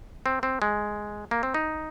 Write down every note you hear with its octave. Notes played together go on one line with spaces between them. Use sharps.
C4
C4
G#3
A#3
C4
D#4